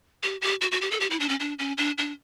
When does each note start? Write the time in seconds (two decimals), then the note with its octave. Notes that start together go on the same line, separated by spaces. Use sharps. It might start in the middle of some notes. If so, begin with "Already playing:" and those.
0.23 G4
0.42 G4
0.61 F#4
0.72 F#4
0.81 G4
0.91 A4
1.00 G4
1.10 E4
1.20 D4
1.29 C#4
1.40 D4
1.59 C#4
1.78 D4
1.98 D4